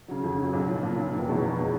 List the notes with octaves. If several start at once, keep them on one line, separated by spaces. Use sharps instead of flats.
C#3 F#3
F2
C#3 F#3
B1
A#2 F3
B1
A#2 F3
F1
E2 B2 G#3
F1
B2 G#3